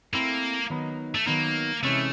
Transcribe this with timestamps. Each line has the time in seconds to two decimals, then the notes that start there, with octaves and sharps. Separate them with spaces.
0.14 A3 A#3 C4 E4 A4
0.70 D#3 F#3 B3 D#4
1.15 A3
1.26 D#3 F#3 A#3 B3 D#4
1.83 C3 E3 G#3 A3 C#4 E4